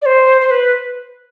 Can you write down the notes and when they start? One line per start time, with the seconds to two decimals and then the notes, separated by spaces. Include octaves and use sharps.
0.02 D5
0.06 C5
0.41 C5
0.51 B4